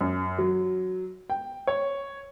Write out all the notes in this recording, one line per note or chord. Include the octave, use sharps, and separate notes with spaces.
F#2
F#3
G5
C#5